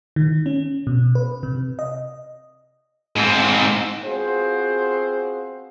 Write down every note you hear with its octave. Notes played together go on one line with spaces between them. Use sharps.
D#3
C#4
B2
B4
C3
D#5
G#2 C4
B3 C4 F4 F#4 G#4 C5